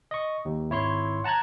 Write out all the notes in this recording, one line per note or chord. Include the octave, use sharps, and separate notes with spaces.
D#5 C#6
D#2
G#1 E4 C#5 C6
F#5 A5 A#5 F#6 G#6